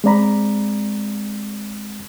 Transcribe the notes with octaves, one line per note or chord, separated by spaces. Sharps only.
G#3 C4 D5 A#5 B5